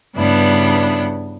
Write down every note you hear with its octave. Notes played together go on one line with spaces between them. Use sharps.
G2 C#3 G3 B3 D4 E4